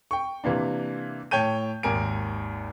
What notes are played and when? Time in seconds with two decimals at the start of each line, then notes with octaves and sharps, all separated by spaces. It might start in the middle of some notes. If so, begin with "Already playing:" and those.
0.11 G5 C#6
0.44 C3 E3 A#3 D4
1.31 A2 C#5 G5 A5 G6 D#7
1.83 G#1 D#2 A#4 G#5 D7